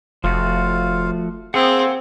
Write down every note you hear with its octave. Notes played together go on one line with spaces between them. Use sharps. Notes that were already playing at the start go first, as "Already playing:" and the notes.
F1 F3 A3 F4 F#4 F5
A#3 C4 G#4 F#5 G#5 E6